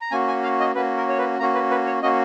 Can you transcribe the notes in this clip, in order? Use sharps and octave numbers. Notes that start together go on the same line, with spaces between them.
A#5
A#3 C#4 F#4 G#5
G#5
F5
D#5
A#3 C#4 F#4 B4
A#4
C#5
B4
A#3 C#4 F#4 A#5
B4
B4
C#5
A#3 C#4 F#4 D#5